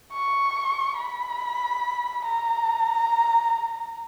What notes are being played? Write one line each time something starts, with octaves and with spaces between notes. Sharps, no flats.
C#6
B5
A#5